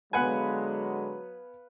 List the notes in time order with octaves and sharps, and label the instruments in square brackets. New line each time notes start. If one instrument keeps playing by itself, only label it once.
[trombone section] D3 G#3 [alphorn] F#3 [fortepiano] B3 F#5 G#5 [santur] B4 F5